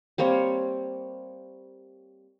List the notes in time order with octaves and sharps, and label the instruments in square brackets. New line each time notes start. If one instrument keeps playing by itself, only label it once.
[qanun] G3 A#3 C4 C#5